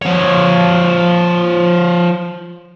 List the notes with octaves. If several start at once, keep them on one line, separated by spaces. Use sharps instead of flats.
F3 C#5